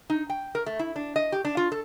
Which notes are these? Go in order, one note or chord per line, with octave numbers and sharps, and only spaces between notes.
D#4
G5
A#4
A3
E4
D4
D#5
G4
D4
F4
A4